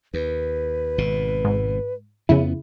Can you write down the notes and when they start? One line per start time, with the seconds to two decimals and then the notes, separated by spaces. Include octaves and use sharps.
0.14 D#2 B4
0.98 G#1 B2
1.45 G#2
2.29 F2 C#3 F3 B3 E4